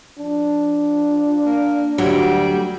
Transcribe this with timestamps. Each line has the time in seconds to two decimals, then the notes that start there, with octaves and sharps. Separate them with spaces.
0.18 F3 D4
1.45 A#3
1.98 D2 F#3 G3